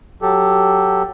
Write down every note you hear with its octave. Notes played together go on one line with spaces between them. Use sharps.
F#3 G4 A4